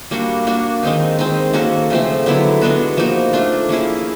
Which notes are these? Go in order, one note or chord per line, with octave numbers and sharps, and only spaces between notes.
G3 A#3 D4 F#4
A#3 D4 F#4
D#3 G#3 C4 D#4
D#3 G#3 C4
A#3 C#4 F#4 A4
C#3 F3 A3 C4
D3 F#3 B3 E4
G#3 B3 D4 F#4
F3 A#3 D#4 F#4
A3 D4 F4
A#3 C#4 E4 G#4